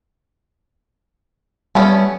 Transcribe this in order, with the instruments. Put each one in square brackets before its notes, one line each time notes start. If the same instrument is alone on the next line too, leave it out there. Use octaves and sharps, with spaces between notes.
[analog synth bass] G3 [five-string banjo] A3 B3 C#4